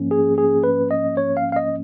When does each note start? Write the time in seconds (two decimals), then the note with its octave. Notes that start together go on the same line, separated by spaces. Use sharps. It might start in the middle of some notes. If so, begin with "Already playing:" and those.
Already playing: G#2 F3 A#3 C#4
0.11 G#4
0.38 G#4
0.64 B4
0.91 D#5
1.17 C#5
1.37 F5
1.52 F5
1.56 D#5